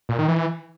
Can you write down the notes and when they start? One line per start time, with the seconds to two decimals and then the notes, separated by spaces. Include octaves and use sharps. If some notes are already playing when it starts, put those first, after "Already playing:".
0.09 A#2
0.19 D#3
0.28 E3